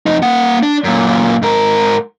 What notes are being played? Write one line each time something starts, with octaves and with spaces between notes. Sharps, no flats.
F2 D#4
A#3 F#5
D4
F#2 A#2
G#2 A#4